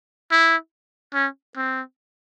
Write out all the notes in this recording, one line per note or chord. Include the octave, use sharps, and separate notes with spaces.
E4
C#4
C4